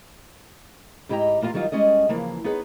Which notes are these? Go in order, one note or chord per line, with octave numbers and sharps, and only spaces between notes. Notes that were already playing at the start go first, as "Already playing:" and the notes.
G#2 E4 G4 D#5 G5 A#5
E2 A#3 E4 F4 F5 A#5
D#3 F#3 G3 D#4 F4
G3 G#3 C#4 D5 D#5
C#3 E3 F3 A#3
B3 D#4 G#4 B4 C#5